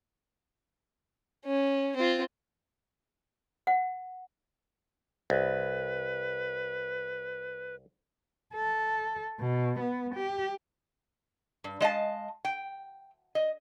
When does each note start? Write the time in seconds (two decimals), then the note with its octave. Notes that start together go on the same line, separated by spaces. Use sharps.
1.45 C#4
1.96 C4 F4
3.67 F#5
5.30 C2 B4
8.54 A4
9.40 B2
9.80 B3
10.15 G4
11.64 G2
11.81 G#3 D#5 F5 A5
12.45 G5
13.35 D#5